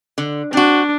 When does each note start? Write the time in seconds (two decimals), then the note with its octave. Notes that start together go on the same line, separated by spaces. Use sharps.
0.18 D3
0.53 C4 D4 F#4